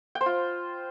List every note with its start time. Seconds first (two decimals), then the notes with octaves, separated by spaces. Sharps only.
0.15 G5
0.21 C5
0.26 F4